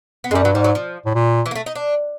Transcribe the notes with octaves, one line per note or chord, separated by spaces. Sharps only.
B3
F#2 G3 G#3
G2 F#3
G#2 G3
F#3
F3
A2
A#2
E3
A#3
A3
D#4
D4